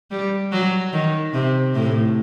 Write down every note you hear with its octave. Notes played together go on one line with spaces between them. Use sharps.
G3
F#3
D#3
C3
A2